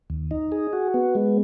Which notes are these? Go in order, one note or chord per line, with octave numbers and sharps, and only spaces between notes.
D#2
D#4
G#4
F#4
B3
G#3